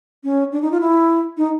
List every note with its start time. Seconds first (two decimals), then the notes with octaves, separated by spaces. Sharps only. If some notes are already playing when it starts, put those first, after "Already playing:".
0.24 C#4
0.52 D4
0.62 D#4
0.71 F4
0.81 E4
1.37 D#4